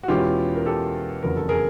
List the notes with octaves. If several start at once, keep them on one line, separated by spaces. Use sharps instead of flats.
F#4
E2 B2 G#3 C#4 E4 F4 G4
A#4
G4 A4
F1 E2 C#3 F#3 B3 A#4
A4
G#4 A#4